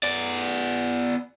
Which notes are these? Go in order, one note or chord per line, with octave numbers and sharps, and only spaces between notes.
B3 D5